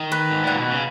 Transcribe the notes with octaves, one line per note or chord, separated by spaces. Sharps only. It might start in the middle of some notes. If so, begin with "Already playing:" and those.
Already playing: D#3
B4
G#2
A#2 F#5
B2
C#3